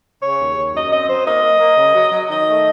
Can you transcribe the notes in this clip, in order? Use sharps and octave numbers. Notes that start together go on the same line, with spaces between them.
C#3 C#5
D#2
D#2
F#2 D#5
C4 D#5
F#3 C5
A#3 D#5
A#3
A#3
C#3
F#3
F#3
D#3 D#5
A3